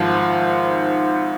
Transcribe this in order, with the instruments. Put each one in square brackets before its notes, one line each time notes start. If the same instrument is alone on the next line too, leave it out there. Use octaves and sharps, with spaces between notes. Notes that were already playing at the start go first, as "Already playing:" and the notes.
Already playing: [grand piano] G#1 G#2 F3